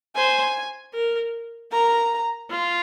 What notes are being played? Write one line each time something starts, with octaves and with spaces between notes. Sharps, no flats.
C5 G#5
A#4
A#4 A#5
F4